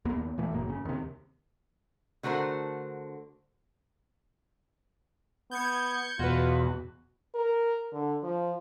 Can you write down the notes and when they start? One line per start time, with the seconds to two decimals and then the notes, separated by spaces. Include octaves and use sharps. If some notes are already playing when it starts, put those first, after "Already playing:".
0.05 D#2 A#3 B3
0.38 A#2 E3 A3
0.52 G1 F#2 A#3
0.69 C#3
0.85 D#2 C3
2.23 D3 A3 F#4 A#4 C5
5.51 B3 G6 G#6 C#7
6.19 E2 B2 F4 F#4 B4
7.35 A#4
7.92 D3
8.23 F3